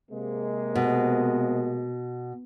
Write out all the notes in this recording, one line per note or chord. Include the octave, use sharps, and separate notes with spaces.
C3 G#3 A#3
B2